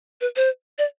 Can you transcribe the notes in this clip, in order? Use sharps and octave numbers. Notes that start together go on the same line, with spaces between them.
B4
C5
D5